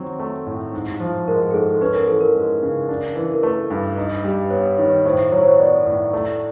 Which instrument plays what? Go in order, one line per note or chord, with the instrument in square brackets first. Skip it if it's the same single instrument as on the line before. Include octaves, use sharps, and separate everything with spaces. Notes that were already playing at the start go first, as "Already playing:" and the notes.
Already playing: [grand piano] D#3 F#3 C4
A3
A2
G#2
F3
[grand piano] G#3 [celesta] A#4
[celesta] G#4
[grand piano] G#2 [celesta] A4
[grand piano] C#4 [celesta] B4
[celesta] A#4
[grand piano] E3 [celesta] A4
[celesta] A#4
[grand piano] G#3
C#3
D4
E3
[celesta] A#4
[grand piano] A3 [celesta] B4
[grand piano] G2
D#4
G3
[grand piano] B3 [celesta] C#5
[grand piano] D#3 [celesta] C#5
[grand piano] A2 [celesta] C5
[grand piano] F#3 [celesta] C#5
[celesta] C5
C#5
[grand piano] B3 [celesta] D5
[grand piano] A2
A3